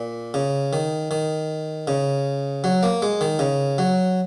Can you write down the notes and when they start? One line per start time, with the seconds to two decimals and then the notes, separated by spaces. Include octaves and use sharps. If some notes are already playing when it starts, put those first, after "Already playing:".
Already playing: A#2
0.34 C#3
0.73 D#3
1.11 D#3
1.87 C#3
2.64 F#3
2.83 A#3
3.02 G#3
3.21 D#3
3.39 C#3
3.78 F#3